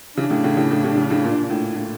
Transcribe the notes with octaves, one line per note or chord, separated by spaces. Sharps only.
C#3 E3 D4
A2 C#3
A2 C#3
A2 C#3
A2
A2 C#3
A2 C#3
A2 C#3
A#2
A2
A2